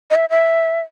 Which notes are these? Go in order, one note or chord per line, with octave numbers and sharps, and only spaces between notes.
D#5
E5
E5